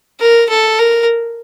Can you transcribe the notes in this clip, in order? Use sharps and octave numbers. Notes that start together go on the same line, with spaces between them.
A#4
A4
A#4